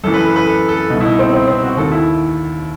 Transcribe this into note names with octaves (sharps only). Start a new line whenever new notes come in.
F#2 E3 A4
B4
A4
B4
A4
A4
C2 B2 D#4
E4
D#4
C4
C4
C4
F#4
D#2 D#3 A4
E4